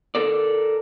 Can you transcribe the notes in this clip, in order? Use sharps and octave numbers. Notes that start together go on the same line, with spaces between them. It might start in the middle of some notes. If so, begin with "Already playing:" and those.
A4 A#4 D5